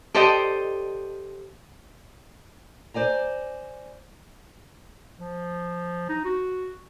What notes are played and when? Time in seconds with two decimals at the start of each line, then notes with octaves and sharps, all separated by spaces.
0.14 G4 A4 C5 D5 D#5 G5
2.94 C5 D5 G#5 A#5
5.17 F3
6.09 D#4
6.25 F#4